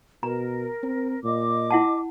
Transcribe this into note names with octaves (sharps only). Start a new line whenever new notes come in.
B2 A#4 A#5
C4
A#2 D#5 D6
E4 F#5 A5